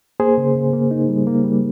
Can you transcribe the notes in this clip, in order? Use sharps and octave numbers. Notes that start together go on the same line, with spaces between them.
A#3 G#4 C5
C#3
C#3
A#3
D#4
G3
A#3
G3